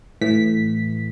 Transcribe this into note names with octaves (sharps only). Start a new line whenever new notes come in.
A2 E3 B6